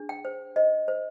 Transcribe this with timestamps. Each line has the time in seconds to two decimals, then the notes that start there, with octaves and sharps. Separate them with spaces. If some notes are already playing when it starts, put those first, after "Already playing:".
Already playing: D4 G#4
0.09 G5
0.25 C5
0.56 C5 D#5
0.88 C5